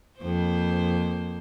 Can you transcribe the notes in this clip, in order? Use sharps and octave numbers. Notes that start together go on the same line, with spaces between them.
F2 A#3 C5